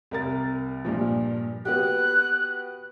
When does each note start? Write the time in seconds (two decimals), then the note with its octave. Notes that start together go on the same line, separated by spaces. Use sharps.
0.11 C2 A#4 A6
0.85 G2 A#2 F3
1.65 B3 F#4 G4 F#6